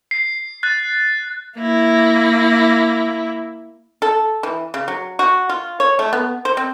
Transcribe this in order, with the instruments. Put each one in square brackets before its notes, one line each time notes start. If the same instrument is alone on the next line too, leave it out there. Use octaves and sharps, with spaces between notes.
[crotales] C7
F#6 A6
[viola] A#3 E4
[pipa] A4
E3
C#3
F#3
F#4
F4
C#5
A3
B3
C5
C4